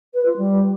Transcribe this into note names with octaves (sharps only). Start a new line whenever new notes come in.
B4
F4
G3